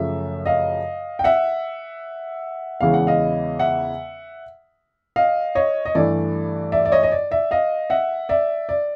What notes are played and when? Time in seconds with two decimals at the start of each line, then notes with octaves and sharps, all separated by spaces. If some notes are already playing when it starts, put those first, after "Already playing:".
Already playing: F#2 C#3 F3 A3 E5
0.46 D#5 F5
1.19 G5
1.24 E5 F#5
2.81 E2 C#3 E3 G#3 C#4 F5
2.94 F#5
3.07 D#5 F5
3.59 E5 F#5
5.16 D#5 F5
5.55 C#5 D#5
5.85 D#5
5.95 G2 E3 A3 D5
6.72 D5 E5
6.85 D5
6.92 C#5 D#5
7.03 D#5
7.12 D5
7.31 D5 E5
7.51 D#5 F5
7.90 E5 F#5
8.29 D5 E5
8.69 D5